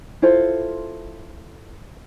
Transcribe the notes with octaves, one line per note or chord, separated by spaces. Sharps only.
E4 F4 A4 C5